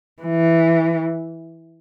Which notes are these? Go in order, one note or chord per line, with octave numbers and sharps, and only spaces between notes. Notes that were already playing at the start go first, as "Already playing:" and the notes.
E3